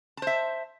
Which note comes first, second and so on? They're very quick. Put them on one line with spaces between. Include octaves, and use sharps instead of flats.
A5 C5 E5